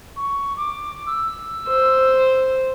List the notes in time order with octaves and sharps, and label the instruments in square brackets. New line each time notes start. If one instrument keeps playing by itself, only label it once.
[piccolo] C#6
D6
E6
[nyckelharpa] C5